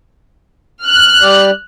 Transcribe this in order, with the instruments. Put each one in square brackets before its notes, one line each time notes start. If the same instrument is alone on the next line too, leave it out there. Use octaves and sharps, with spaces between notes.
[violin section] F6 F#6
[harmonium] G3 G4 D5